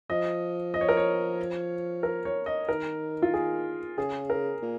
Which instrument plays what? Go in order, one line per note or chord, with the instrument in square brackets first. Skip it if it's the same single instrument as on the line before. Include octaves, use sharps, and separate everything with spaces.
[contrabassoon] F3 [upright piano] D#5
[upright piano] D#5
C#5
A#4
C#5
A#4
C#5
D#5
[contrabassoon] D#3 [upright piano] A#4
[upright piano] F4
G#4
[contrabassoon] C#3 [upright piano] G#4
[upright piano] A#4
[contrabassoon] A#2